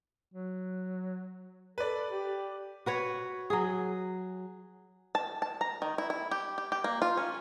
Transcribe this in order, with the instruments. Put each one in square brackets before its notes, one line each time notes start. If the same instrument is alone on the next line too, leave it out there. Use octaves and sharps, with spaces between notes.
[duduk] F#3
[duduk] A4 [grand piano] B4 D5
[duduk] G4
[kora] F#4 B4 C#5
F#3 G#4
[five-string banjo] A5
A5
A#5
D#3
E4
E4
G4
G4
G4
A#3
F4
C#4